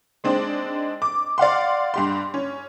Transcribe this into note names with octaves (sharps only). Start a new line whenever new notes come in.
G#3 C4 D4 D#4
D6
D5 F5 F#5 C6
G2 G4 C6
C#4